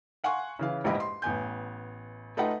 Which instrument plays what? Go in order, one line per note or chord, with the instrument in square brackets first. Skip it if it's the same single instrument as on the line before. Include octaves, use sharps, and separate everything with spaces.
[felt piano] F5 F#5 G#5 C6 C#6 F#6
C#3 E3 F5
A#1 E2 G#2 G4 D#5 B5
C6
A1 B3 G#5 G6
A3 D#4 F4 B4 F#5 G5